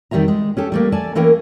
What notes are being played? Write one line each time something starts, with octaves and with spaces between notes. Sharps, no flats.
F2 D#3 G3 F4 E5 A#5
G#3
C#4 G4 A4
G3 A3 A#3
A3 D5 G#5 A5
E3 A3 A#3 C#4 A#4 G5